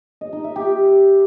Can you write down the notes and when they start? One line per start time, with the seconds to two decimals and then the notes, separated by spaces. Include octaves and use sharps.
0.21 D#5
0.33 D#4
0.44 E5
0.56 G4